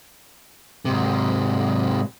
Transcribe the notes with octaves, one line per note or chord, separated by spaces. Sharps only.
G#2 C3